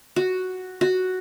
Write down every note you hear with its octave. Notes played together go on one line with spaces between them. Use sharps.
F#4
F#4